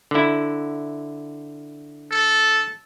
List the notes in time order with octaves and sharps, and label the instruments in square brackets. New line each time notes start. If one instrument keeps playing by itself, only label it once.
[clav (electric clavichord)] D3 E4
[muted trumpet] A4